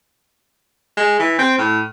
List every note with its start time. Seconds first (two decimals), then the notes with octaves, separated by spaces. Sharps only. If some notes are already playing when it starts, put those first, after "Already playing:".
0.97 G#3
1.20 E3
1.39 C4
1.58 A2